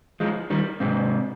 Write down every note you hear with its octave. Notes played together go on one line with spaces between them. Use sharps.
F3 G#3
D#3 G3
G#2 C3